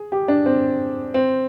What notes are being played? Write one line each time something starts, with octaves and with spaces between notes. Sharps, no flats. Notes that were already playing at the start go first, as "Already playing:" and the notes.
Already playing: G#4
G4
D4
C4
C4